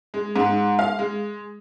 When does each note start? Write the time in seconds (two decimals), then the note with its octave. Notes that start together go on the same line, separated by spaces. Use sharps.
0.14 G#3
0.36 G#2
0.79 F5
0.99 G#3